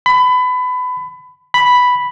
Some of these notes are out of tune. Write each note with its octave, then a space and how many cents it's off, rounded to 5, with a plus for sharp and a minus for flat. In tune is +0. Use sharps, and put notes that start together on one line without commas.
B5 +25
B5 +0